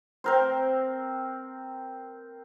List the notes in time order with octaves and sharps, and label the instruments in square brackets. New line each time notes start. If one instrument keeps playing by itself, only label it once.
[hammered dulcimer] C4 A#4 C5